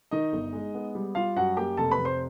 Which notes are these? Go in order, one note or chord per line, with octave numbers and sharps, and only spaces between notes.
D#3 D#4 D#5
G1
G#3
B3
G3
G3 F4 F5
F#2 F#4 F#5
A#3 G4 G5
F1 A4 A5
B4 B5
F1
C5 C6